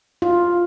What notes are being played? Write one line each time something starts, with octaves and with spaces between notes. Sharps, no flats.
F4